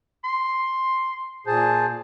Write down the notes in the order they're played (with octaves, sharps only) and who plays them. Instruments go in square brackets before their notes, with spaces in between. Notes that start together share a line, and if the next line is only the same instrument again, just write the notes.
[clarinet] C6
[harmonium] A#2 G#4 A5 [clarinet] C5